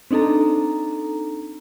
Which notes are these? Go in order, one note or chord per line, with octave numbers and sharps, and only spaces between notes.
C4 D4 D#4 A4 A#5